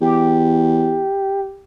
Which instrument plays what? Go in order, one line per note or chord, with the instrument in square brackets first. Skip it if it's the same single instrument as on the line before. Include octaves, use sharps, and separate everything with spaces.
[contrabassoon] E2 [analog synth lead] G4